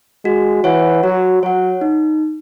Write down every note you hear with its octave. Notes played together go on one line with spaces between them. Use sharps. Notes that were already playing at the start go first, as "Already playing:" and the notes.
G#3 F#4
E3 C#5 F#5
F#3 F#4
F#3 C#5 F#5
D#4